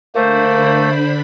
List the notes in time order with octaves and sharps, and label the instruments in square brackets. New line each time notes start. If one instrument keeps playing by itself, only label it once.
[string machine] D3 D4 B5 [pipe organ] A3 [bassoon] A#3 [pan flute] C5